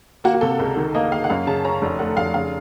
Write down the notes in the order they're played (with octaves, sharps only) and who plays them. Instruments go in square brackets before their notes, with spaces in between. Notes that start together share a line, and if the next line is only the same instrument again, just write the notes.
[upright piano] A#3 [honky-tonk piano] F#4
[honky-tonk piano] F#4
[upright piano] C3 [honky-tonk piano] A4
[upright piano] C#2 [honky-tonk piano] A#4
[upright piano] D#3
[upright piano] A#3 [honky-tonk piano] D#5
[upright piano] A#3 [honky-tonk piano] F5
[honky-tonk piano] F#5
[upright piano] F#2 [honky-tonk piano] F5
[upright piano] C#3 [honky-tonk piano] A5
[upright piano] C#4 [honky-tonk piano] A#5
[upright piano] F1
[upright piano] A3 [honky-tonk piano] F#5
[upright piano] F1 [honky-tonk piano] F5
[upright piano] C#3 [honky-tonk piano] F5